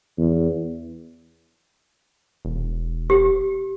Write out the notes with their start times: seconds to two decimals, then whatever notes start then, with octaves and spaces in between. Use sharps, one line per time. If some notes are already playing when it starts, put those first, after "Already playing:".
0.18 E2
2.45 E1
3.10 G4